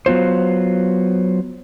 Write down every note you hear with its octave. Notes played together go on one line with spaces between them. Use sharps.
F#3 B3 F4 C5